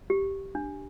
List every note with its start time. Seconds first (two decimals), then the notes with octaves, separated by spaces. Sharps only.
0.10 G4
0.55 D4